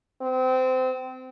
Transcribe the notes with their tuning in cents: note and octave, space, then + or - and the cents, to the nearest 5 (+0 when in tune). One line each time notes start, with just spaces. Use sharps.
C4 -25